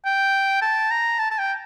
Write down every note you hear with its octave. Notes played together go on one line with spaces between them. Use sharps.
G5
A5
A#5
A5
A5
G5